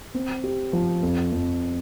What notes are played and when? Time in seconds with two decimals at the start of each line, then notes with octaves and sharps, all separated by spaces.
0.14 C4
0.44 G4
0.73 F3
1.03 F2
1.32 F2